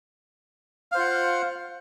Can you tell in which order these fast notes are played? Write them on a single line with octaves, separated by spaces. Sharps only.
F5 C5 F4 F#5